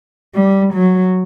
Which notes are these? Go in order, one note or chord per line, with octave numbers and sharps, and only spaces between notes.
G3
F#3